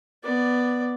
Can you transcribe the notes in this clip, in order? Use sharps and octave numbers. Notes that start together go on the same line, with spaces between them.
B3 D5